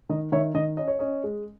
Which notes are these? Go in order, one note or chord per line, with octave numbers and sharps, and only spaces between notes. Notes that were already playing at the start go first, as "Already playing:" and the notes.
D#3 D#5
D#3 C#5 E5
D#3 D#5
C#4 D#5
C#5
C#4 D#5
G#3